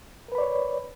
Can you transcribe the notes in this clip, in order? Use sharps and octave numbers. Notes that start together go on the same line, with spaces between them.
A#4 B4 C#5 D5 B5